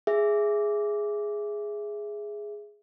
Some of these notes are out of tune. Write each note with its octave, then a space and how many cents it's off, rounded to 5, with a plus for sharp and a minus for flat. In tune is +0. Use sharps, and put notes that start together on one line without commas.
G#4 +0 E5 +10